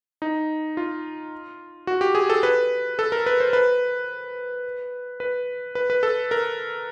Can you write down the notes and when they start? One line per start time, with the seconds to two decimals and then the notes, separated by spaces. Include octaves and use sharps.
0.22 D#4
0.77 F4
1.87 F#4
2.01 G4
2.15 G#4
2.30 A4
2.43 B4
2.99 A4
3.12 A#4
3.26 B4
3.40 C5
3.53 B4
5.20 B4
5.75 B4
5.90 B4
6.03 A4
6.31 A#4